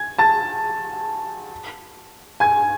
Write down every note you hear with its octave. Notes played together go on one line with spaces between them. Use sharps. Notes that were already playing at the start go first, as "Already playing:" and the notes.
Already playing: G#5 G#6
A5 A6
G#5 G#6